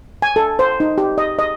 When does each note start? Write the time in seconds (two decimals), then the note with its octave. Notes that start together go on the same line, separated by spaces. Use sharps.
0.22 G#5
0.36 A4
0.59 C5
0.80 D#4
0.98 G4
1.18 D#5
1.39 D#5